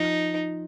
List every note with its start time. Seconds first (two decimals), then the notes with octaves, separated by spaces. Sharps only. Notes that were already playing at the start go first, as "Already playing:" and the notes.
Already playing: F3 D#4